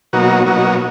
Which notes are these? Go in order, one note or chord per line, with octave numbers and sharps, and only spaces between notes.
B2 F#3 A#3 D#4 F#4
B2 F#3 A#3 D#4 F#4